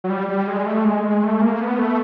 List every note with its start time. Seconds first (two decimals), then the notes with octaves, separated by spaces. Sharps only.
0.04 F#3
0.10 G3
0.29 G3
0.47 G#3
0.66 A3
0.85 G#3
1.04 G#3
1.23 A3
1.41 A#3
1.61 B3
1.79 A3